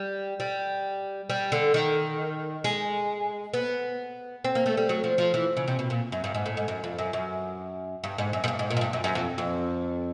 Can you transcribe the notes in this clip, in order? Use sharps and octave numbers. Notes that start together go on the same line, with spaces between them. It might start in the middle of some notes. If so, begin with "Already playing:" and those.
Already playing: G3
G3
G3
D3
D#3
G#3
B3
C4
A#3
A3
G3
F#3
F3
F3
E3
C#3
C3
B2
A#2
F#2
G2
G#2
A2
G#2
F#2
F2
F#2
F#2
G2
G#2
F#2
G#2
G2
G#2
A#2
G#2
G2
F#2
F#2
F2
F2